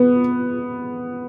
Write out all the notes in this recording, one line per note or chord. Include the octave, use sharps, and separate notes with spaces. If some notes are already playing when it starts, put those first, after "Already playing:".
Already playing: B3